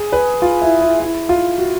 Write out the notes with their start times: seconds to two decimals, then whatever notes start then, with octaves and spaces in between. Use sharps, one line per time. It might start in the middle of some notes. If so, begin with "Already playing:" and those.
Already playing: G#4
0.12 B4
0.42 F4
0.62 E4
0.81 E4
1.00 E4
1.29 F4
1.58 F#4